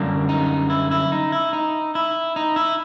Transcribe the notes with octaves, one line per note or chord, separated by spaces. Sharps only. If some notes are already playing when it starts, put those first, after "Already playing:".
Already playing: F#2 D3 G3 A#3 D4
D#4
E4
E4
D#4
E4
D#4
E4
D#4
E4